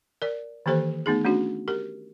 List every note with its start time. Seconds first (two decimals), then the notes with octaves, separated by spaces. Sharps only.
0.22 A#4 D5
0.66 D#3 E3 A#3 G4 A4 C5
1.06 A3 B3 D#4 G#4
1.25 A3 C#4 D4 F#4
1.68 G4 A#4